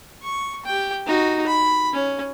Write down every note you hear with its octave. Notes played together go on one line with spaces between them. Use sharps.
C#6
G4 G5
D#4 F#4
B5
C#4